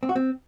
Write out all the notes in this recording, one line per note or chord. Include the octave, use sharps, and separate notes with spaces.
C4
F#4
C4